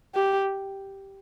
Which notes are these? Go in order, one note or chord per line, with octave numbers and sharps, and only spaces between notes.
G4